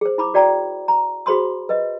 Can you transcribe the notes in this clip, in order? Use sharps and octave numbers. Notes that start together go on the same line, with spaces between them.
G#4 C5
E4 B5 D6
F#4 D5 G5 A#5
A#5
F#4 G#4 C5 B5 C6 D#6
B4 D#5